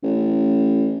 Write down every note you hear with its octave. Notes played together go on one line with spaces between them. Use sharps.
A1